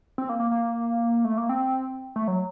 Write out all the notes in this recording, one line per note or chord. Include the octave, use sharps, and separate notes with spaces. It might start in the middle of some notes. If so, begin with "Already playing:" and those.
C4
A#3
A#3
A#3
A3
A#3
C4
A3
F#3